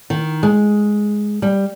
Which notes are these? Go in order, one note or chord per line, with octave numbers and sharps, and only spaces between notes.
D#3
G#3
G3